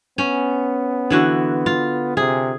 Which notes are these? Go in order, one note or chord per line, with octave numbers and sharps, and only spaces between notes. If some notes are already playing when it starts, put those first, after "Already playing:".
B3 C#4
D3 E3 F#4
F4
C3 G#4